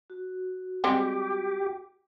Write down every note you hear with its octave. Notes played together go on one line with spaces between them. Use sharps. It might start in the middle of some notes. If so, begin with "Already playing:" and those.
F#4
G3 G#3 C4 G4